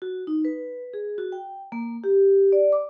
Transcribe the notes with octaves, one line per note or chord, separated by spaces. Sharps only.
F#4
D#4
B4
G#4
F#4
G5
A#3
G4
D5
D6